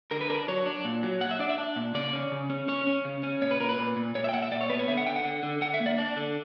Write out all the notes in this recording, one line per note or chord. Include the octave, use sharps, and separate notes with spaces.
D3 A#4
B4
D4 A#4
F#3 C#5
D4
A#2
F#3
A#2 F#5
E5
D4 D5
E5
D4
A#2
C#3 D5
C#4
C#3
C#4
C#4 C#5
C#4
C#3
C#4
A#2 C#5
B4
A#2 A#4
B4
A#2
A#2
A#2 C#5
E5
G5
A#2 F#5
E5
A#2 D5
C#5
B3 B4
C#5
D3 E5
F#5
D3 G5
F#5
D3
D3
D3 F#5
E5
A#3
D5
D4 D5
D3